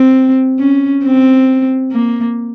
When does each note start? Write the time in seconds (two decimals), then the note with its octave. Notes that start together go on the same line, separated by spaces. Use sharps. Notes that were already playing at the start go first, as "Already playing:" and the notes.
Already playing: C4
0.59 C#4
1.04 C4
1.92 A#3